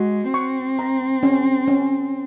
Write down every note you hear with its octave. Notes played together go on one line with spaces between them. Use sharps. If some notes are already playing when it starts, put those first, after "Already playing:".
Already playing: G#3 F#4
C4 C#6
A#5
C#4
C#4